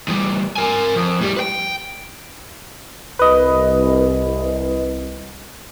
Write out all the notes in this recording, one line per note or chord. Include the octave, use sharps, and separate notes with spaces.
E2 G3
A#4 G#5
F2
A2 G3
B4 G5
C2 B4 D#5